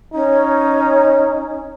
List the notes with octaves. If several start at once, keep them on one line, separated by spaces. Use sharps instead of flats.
C#4 D#4